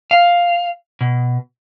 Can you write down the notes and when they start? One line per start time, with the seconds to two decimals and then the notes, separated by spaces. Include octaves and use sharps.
0.11 F5
1.01 B2